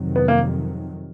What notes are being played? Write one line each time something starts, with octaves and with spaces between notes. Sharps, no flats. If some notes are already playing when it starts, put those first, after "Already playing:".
Already playing: F2 C3 D#3 F#3
B3
A#3